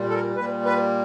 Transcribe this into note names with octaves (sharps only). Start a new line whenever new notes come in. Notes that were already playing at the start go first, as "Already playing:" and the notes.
Already playing: A#2 G3
A4
A#4
A#2 G3 B4
B4